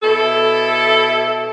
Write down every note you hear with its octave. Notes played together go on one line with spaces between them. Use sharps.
B2 E4 A4